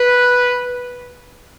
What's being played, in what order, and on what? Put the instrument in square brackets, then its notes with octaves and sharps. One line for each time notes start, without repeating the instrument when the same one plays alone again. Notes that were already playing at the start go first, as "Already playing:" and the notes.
Already playing: [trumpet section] B4